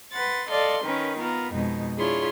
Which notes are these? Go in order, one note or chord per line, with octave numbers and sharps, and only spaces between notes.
B4 F#5 C6 A6
A4 D5 D#5 F5 C6
D#3 C#4 A#4 B4
B3 F4 A#4
F2 B2 G#3 D#4
D4 E4 F4 G#4 C#5 C6